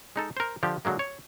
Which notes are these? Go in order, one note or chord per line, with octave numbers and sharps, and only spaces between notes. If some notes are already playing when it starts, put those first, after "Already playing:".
G#3 D#4 A4
A#4 C5
D3 F3 G4
D3 F#3 G#3 A#3
C#5